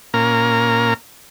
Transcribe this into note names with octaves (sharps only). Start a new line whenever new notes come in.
A#2 A#3 C#4 A#4 A#5